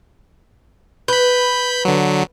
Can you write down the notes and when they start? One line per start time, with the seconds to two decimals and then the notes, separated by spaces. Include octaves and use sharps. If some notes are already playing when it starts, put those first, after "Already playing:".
1.08 B4 B5 G6
1.85 D3 F#3